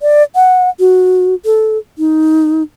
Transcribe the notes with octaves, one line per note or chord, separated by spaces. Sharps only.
D5
F#5
F#4
A4
D#4